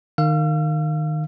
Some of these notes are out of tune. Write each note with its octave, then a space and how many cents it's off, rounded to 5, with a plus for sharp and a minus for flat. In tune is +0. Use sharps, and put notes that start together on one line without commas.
D#3 -20 F5 +0 E6 +45